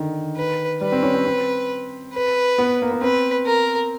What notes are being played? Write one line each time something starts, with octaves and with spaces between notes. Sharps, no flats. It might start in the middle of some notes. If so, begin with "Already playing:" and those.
Already playing: D3 D#3
B4
G3 B4
C4
C#4
C4
C4
B4
B3
A#3
B3
C4 B4
A#4